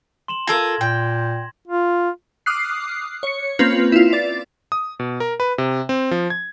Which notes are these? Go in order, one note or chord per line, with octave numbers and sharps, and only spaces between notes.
C6 E7 F#7
F4 A4 A#4 G#6 A#6
A#2 G5
F4
D6 D#6 F6 F#6 C7
C#5 C#7
A#3 C4 C#4 F4 B4
E4 F4
D5 A6
D#6
B2
A#4
B4
C3
C4
F3
G#6